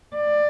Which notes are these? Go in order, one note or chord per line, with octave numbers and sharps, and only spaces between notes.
D5